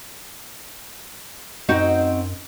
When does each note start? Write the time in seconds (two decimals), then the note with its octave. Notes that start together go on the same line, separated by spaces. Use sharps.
1.69 F#2 C4 D#4 F#4